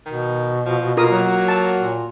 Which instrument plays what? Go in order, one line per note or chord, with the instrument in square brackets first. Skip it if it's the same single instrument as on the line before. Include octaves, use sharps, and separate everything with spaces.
[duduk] B2 [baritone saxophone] D#3
[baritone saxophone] F3
[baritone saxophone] A#3 [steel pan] F4 A#4 D#6
[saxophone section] F#3
[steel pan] A5
[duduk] A#2